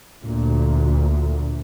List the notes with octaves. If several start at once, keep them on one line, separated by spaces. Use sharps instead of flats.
D2 A#2